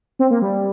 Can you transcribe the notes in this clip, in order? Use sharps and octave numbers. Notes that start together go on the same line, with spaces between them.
C4
A#3
G3